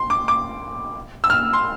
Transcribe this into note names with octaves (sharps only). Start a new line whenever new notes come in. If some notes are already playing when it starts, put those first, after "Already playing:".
Already playing: C6
D6
D6
E6
F6
C6